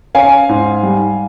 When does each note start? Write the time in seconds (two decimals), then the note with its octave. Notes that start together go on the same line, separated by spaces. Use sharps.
0.15 C#4 F5 G#5
0.49 G#2
0.83 G3